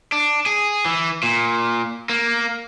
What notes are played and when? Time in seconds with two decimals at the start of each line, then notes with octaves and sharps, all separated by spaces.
0.12 D4
0.46 G#4
0.85 E3
1.23 A#2
2.09 A#3